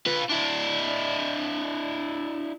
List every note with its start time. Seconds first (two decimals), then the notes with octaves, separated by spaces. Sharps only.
0.06 F4 B4
0.30 D4 E4